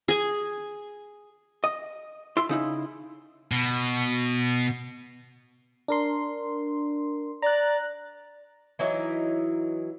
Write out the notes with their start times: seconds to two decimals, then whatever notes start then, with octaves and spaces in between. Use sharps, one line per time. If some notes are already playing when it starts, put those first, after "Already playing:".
0.08 G#4 G#5
1.64 D#5
2.37 E4 C6
2.49 C#3 D#4 E4
3.52 B2
5.88 D4 A#4 C6
7.42 D5 A#5 F#6
8.79 E3 F#3 D#4 E4